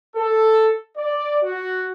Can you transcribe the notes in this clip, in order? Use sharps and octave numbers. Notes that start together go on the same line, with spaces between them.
A4
D5
F#4